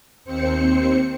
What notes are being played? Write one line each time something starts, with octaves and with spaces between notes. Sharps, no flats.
D#2 C4 C5 C#7